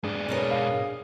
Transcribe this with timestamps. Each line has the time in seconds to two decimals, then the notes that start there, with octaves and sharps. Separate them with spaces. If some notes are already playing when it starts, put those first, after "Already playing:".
0.04 G#2 D4 G#4
0.29 B2 A#4 C#5
0.51 F5